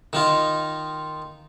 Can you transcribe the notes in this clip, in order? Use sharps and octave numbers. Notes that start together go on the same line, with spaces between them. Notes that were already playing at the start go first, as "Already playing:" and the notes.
D#3 D#4 F4